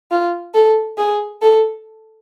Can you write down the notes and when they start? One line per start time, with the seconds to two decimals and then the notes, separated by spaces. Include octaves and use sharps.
0.11 F4
0.54 A4
0.98 G#4
1.41 A4